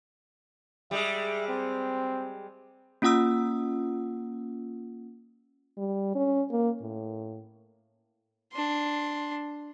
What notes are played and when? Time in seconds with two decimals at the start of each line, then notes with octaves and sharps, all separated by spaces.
0.91 G3 G#3 G#4 E5
1.48 C4
3.02 A#3 C#4 F4 F#5 D#6 E6
5.77 G3
6.15 C#4
6.51 A#3
6.81 A2
8.53 D4 C6